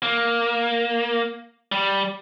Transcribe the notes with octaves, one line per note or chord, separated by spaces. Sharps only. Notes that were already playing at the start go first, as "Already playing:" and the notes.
A#3
G3